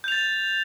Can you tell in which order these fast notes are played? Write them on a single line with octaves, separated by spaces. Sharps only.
G6 F7 A6